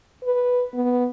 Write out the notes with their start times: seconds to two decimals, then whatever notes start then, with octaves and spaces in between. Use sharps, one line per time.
0.24 B4
0.74 B3